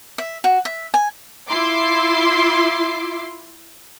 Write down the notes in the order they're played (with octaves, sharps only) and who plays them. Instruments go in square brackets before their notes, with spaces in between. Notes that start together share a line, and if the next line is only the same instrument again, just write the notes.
[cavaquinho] E5
F#4
E5
G#5
[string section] E4 F4 E5 C6 D6